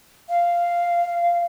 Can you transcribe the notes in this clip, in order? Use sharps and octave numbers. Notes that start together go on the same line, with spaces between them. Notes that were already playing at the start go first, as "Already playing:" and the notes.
F5